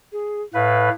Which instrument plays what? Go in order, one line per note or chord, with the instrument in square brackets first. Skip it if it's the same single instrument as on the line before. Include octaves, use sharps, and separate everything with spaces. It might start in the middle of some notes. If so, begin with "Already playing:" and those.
[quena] G#4
[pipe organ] A2 B4 [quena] F5